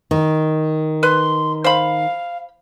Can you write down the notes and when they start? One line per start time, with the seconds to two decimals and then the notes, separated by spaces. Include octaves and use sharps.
0.11 D#3
1.03 B4 C6
1.64 C5 F5 B5